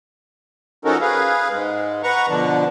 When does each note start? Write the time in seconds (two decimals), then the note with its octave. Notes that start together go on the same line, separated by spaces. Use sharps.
0.85 F3 C#4 D#4 F#4 A4 A#4
1.01 G#4 B4 F5
1.52 G#2 G#3
2.03 B4 F#5 A#5 C#6
2.29 B2 D3 F3 D4